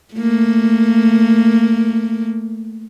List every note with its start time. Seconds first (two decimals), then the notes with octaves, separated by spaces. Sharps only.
0.14 A3 A#3